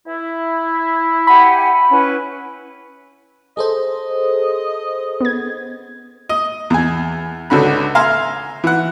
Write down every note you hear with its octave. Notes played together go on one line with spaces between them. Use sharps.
E4
G4 F#5 G#5 B5
C#4 E4 B4
G#4 A4 C5 D#5
B3 G#6
D#5
E2 G#5
C#2 D3 F#4 B5
E5 F5 G#5 A#5 C6
E3 F#5